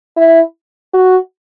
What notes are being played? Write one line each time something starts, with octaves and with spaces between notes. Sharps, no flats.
E4
F#4